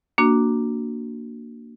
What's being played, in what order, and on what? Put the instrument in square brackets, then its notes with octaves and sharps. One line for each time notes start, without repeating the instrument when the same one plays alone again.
[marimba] A#3 D4 F#4